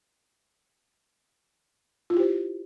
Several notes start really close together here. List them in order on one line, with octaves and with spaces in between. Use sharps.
F4 E4 G4 C5